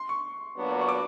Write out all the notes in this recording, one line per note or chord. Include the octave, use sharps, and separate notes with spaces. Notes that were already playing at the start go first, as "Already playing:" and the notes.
Already playing: C6
C#6
A#2 F#3 B3 D4 F#4
C#6
D6